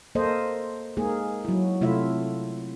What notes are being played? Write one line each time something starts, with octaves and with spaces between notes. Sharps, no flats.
A#3 A4 C5 D#5
G#3 A#3 D#4 G#4
F#3 E4
C3 A3 E4 F4 E5